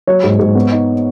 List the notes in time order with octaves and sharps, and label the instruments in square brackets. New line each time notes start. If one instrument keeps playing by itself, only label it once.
[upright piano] F#3 C#5
G#2
G#2
B3
D#4